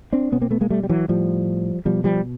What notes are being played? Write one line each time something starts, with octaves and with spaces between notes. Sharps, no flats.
C4 D4
B2 B3 C#4
A#3 C4
A3 B3
G#3 A#3
G3 A3
G3
E3 F#3
A2 F3 G3
B2 F3 G3
F3 G3